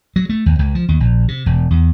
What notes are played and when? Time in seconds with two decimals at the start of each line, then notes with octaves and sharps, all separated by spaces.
0.16 F#3
0.29 A3
0.46 D#2
0.59 C#2
0.75 F3
0.88 D#2
1.00 A#1
1.28 C3
1.46 E1
1.70 E2